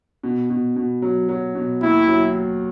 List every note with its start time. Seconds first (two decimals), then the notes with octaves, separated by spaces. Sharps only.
0.23 B2
0.50 B2
0.76 B2
1.02 F#3
1.29 F#3
1.55 B2
1.82 D#2 E4
2.08 F#3